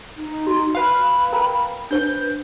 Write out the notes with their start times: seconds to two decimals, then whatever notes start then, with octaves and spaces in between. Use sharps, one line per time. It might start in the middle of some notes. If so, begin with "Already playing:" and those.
0.17 D#4
0.47 F#4 C6
0.75 B4 F5 B5
1.33 A#4 G5 A#5
1.91 D4 B4 C5 G6